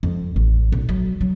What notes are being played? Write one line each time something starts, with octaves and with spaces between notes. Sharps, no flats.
F2
A1
B1
F#3
F#3